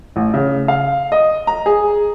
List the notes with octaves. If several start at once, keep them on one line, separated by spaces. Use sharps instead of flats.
A1
C#3
F5
D#5
A#5
G#4